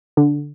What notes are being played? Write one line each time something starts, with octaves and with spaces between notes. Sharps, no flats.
D3